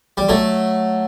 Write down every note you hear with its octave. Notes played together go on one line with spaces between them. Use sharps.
G3
F#3 A3